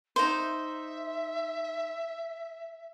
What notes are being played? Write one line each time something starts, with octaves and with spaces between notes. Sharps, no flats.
D#4 C5 E5